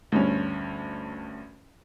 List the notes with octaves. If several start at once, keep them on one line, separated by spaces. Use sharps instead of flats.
D2 G2 C#4